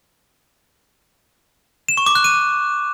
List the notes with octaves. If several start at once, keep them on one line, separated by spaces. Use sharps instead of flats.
E7
C#6
D6
F#6
D#7